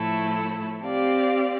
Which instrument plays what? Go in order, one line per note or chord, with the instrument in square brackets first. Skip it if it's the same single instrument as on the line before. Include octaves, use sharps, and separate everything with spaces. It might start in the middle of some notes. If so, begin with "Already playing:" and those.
Already playing: [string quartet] A2 F3 A3 E4 A4
C4 G4 D5 F5